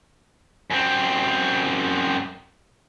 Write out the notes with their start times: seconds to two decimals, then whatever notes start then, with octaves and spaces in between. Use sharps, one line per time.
0.70 F#2 C4